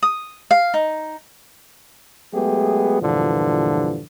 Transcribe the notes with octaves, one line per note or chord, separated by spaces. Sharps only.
D#6
F5
D#4
F#3 G#3 A3 B3 G4 G#4
E2 G2 A#2 D3 E3 F3